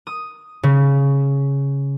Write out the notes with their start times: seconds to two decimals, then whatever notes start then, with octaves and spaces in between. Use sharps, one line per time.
0.07 D#6
0.63 C#3